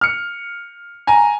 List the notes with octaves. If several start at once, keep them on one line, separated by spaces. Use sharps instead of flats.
F6 C#7
G#5 A#5